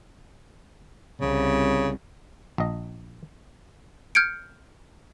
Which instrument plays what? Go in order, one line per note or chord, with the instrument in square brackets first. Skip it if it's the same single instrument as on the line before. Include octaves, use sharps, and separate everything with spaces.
[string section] C2 [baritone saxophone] C#3
[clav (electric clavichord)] A#1 D#5
[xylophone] F6 G6 G#6 C#7 D7